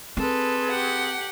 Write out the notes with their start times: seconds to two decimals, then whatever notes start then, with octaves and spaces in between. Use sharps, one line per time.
0.17 C4 G#4 A4 B4 C6
0.70 G4 F#5